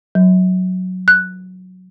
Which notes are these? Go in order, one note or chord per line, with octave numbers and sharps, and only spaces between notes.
F#3
F#6